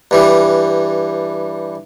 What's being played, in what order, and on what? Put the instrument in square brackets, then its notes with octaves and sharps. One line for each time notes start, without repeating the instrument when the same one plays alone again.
[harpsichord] G2 E3 G3